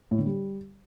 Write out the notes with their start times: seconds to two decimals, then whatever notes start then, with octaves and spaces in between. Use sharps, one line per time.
0.11 A2
0.19 D3
0.26 G3